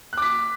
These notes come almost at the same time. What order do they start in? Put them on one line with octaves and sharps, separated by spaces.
F#6 D6 B6